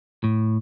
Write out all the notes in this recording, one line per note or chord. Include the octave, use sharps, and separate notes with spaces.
A2